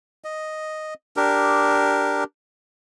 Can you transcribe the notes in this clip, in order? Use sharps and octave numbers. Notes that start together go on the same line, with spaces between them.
D#5
D4 G4 A#4